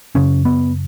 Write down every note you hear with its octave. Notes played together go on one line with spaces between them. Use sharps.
F#2 C#3 C#4
B3